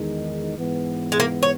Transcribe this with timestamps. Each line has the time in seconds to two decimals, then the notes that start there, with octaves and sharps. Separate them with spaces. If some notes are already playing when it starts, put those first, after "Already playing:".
Already playing: E2 D#3 G#3 D#4
0.57 G#2 E3 B3
1.12 G#3
1.20 A#3
1.43 C#5